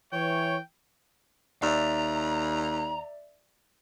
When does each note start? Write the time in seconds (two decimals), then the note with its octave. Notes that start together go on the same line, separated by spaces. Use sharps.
0.12 E3 C#5 G5
1.62 D#2 D5 E5 A#5